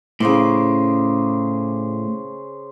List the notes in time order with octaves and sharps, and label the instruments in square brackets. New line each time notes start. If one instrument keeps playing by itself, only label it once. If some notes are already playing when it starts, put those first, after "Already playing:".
[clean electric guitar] A2 [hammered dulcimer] C#3 C5 D6